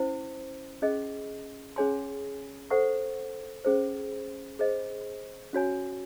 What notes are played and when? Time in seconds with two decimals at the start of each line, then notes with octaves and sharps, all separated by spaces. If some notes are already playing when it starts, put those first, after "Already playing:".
Already playing: C#4 E4 C5
0.82 C#4 G#4 D#5
1.76 C#4 G#4 C#5 G#5 C6
2.70 A4 C5 F#5 C#6
3.65 C#4 G#4 C5
4.59 G#4 C5 D#5
5.53 C#4 F#4 C#5 G#5